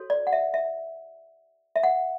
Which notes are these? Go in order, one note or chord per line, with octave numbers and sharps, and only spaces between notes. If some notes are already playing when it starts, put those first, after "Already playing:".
Already playing: F#4 A4 C#5
D5
F#5
E5
E5
E5
F#5